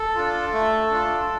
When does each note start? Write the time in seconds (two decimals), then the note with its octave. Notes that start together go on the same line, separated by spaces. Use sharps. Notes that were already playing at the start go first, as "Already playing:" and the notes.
Already playing: A4
0.15 D4 F4
0.53 A3
0.91 D4 F4